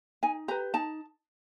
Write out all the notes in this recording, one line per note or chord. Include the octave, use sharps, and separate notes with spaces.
D#4 G#5
G4 B4 A#5
D#4 A5